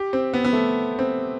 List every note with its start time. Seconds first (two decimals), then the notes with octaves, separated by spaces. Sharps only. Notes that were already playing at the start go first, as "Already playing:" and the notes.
Already playing: G4
0.13 C4
0.34 B3
0.45 B3
0.53 A3
0.99 C4